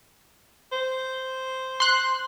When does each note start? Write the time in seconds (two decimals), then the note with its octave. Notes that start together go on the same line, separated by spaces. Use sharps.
0.72 C5
1.80 C6 F#6